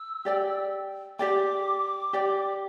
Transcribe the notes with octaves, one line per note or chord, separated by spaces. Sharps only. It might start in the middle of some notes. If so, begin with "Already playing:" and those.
Already playing: E6
G4 D5 G5
G4 D5 G5 D6
G4 D5 G5